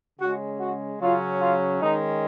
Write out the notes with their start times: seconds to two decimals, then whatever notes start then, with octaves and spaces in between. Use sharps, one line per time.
0.20 C#3 G#3 C#4 F#4
0.60 F#4
1.01 C#3 F#3 C#4 F4
1.40 F4
1.82 D#3 G#3 C#4 D#4